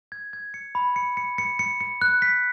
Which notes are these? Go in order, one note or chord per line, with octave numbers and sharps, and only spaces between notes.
G#6
G#6
C#7
B5
C#7
C#7
C#7
C#7
C#7
F#6
B6